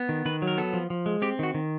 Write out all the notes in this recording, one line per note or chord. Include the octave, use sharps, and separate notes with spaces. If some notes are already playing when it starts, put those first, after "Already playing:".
Already playing: B3
D#3
D#3 B4
F#3
A#4
B3 A4
F3
F3
G#3
C4 G4
D#3 F#4
D#3